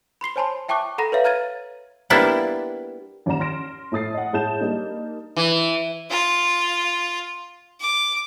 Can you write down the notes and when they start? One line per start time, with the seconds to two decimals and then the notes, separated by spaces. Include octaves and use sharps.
0.21 B5 C6 C7 G7
0.36 C5 C#5 G#5 A5 B5 C6
0.69 E5 G5 A5 C#6 D6 F#6
0.98 A4 F#5 A#5 B5 A#6
1.12 B4 C#5 E5 F5
1.24 A#5 F6 G#6 A6 D#7
2.10 G3 A#3 B3 D4 E4 F4
3.26 A1 D#2 D5 F#5 A#5 E7
3.40 C6 F6 A#6 D7
3.92 A2 A3 D#6 A6 C7
4.14 D#5 F#5
4.33 A2 G#3 A5 G6 A6 E7
4.60 G3 A#3 D4 D#4
5.36 E3
6.10 F4
7.80 D6